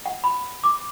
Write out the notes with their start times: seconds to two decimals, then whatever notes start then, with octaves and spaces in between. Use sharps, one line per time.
0.06 F#5
0.24 B5
0.64 D6